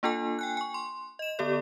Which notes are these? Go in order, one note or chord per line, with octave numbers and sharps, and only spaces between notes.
A#3 D4 F4 A4 G#5
G5 G#5 F#6
G#5 C#6
C6
D#5 E7
D3 B3 G4 A4 D5